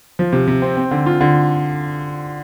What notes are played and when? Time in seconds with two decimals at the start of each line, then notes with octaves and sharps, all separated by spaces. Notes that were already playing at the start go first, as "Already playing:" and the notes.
0.19 F3
0.33 C3
0.47 C3
0.62 C4
0.77 C4
0.91 D3
1.06 F4
1.21 D3